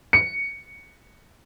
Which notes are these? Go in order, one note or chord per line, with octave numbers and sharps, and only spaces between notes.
C#7